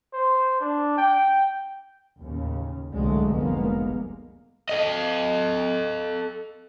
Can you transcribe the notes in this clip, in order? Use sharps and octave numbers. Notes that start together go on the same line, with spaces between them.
C5
D4
G5
D#2 A2 C#3
C2 G#2 D3 F#3 G#3 A3
F1 C2 G#3 A#3 B3
A4 D#5